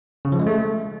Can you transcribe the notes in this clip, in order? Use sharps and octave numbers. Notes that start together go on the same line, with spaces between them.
C#3
F3
G#3
A3